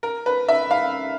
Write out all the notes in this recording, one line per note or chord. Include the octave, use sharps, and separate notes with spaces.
A#4
B4
E5
F5